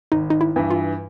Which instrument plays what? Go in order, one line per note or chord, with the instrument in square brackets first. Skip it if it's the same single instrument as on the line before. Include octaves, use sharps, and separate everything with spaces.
[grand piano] G#1 [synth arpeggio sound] D#4
[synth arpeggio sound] D#4
E4
[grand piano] G2 E3
[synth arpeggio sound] F4